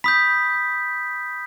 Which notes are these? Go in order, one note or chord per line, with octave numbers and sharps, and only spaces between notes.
B5 D#6 G6 B6